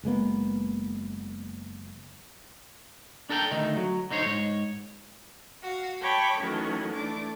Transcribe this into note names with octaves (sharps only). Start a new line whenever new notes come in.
F#1 G#3 A#3 B3
D4 A4 A#4 F#5 G5
D2 D#3 A3 D#4
F#3
D3 D#4 C5 C#5
G#2 C#5
F#4 F5
C#5 G5 A5 B5 D6
D#3 E3 F#3 A3 C#4
E3 A3 D4 D6